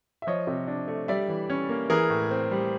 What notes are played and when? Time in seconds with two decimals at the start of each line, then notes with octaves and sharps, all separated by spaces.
0.22 E5
0.27 F3 C#5 D#5
0.47 C3
0.67 D4
0.88 A3
1.08 G3 D5 E5
1.28 E3
1.50 C#4
1.69 A#3
1.90 E3 G#4 A#4
2.10 A2
2.31 C4
2.51 G3